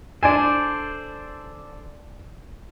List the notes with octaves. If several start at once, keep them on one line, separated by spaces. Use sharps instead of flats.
D4 A4 C5 D5 G#5